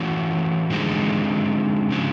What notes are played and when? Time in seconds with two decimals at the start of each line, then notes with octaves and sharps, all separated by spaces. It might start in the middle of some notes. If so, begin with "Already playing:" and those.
Already playing: E3 A3 C#4 F#4
0.70 D3 F3 G#3 C4 D#4
1.91 C#3 F3 G#3